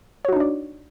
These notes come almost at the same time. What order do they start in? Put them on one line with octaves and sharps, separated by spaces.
C#5 F#4 D#4 D4 D5